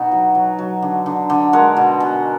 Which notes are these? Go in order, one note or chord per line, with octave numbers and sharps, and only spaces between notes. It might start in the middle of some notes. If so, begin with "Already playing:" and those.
Already playing: B2 D#4 F#4
F#3
F#3
F#3
D3
D3
D3
G#3 F#4 A#4
B2
B2